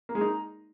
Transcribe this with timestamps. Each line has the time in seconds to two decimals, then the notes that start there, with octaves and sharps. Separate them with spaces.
0.09 A#3
0.15 G#3
0.21 D#4